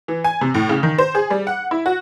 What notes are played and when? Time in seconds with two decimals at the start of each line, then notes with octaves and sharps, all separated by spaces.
0.08 E3
0.24 G#5
0.41 C3
0.54 A2
0.69 C#3
0.83 D#3
0.98 C5
1.15 G#4
1.30 G3
1.47 F#5
1.71 E4
1.86 F#4